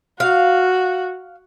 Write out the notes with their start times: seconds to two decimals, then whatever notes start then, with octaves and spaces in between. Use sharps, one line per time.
0.20 F#4 F5